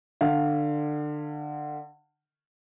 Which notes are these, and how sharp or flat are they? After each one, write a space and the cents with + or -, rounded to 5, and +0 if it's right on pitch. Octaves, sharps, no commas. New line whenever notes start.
D3 +25 F5 +0